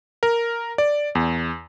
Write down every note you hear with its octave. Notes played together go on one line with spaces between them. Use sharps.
A#4
D5
E2